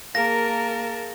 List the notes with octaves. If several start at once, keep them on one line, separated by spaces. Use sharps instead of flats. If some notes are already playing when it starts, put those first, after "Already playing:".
A#3 G#4 A#4 F5 A5 A#6